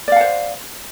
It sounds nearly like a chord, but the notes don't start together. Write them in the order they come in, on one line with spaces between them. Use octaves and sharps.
D5 F5 F#5 C5